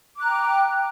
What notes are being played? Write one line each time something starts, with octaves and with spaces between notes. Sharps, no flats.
G5 A#5 D6 F#6